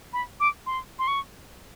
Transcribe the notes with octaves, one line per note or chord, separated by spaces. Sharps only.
B5
D6
C6
C6
C#6